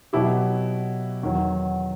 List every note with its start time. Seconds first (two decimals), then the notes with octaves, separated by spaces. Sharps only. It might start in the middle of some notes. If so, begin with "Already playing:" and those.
0.13 B2 F#3 B3 E4 G4
1.23 E2 D#3 F#3